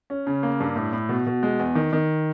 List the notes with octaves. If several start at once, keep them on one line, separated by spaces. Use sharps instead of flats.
C#4
C#3
A#3
G2
A2
A2
B2
B2
G#3
E2
D#3
D#3